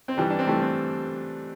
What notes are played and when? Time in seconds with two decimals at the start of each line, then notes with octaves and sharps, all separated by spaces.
0.08 C4
0.17 G2 E3 G3
0.30 D4
0.39 C4
0.47 G2 E3 G3 A3
0.62 C4